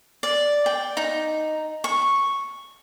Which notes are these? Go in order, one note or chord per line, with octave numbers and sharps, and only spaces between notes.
D5
G5
D#4
C#6